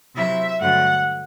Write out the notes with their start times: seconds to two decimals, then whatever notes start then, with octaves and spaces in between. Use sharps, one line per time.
0.15 C3 F#3 C4 E4 E5
0.60 G2 D3 F#3 A3 F#5